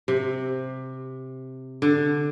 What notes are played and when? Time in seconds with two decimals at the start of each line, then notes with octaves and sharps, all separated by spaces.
0.08 C3
1.82 D3